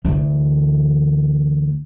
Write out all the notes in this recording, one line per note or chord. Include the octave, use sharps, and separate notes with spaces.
D2 E3